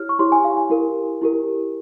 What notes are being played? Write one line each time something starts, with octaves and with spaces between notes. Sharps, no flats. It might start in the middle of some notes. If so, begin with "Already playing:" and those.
Already playing: E4 G4 C#5 F6
C#6
E4 G4 C#5 C6
G#5
F5
G#5
E4 G4 A#4
E4 G4 A#4